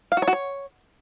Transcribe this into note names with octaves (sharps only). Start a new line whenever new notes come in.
F5
F#4
C#5
F#4
C#5